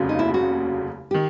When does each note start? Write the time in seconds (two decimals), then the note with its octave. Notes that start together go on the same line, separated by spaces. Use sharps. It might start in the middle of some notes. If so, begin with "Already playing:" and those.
Already playing: F1 D#2 C#3 F#3
0.09 D#4
0.19 E4
0.34 F#4
1.11 D#3 G4